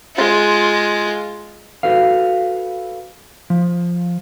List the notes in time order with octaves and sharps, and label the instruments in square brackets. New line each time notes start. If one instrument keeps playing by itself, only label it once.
[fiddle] G#3 F4
[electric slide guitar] F#4 A4 B4 F5
F3